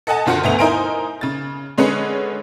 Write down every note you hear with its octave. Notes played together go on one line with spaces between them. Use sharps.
A4 D#5 F#5 G#5 A5
F#1 D3 F4 F#4 C5 C#7
G1 D2 A3 B3 F7
D#4 E4 A#4 C5 G#5 D7
C#3 A6
D3 G#3 C#4 B4 C#7